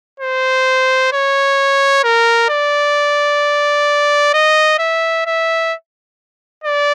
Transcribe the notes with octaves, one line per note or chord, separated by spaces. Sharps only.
C5
C#5
A#4
D5
D#5
E5
E5
D5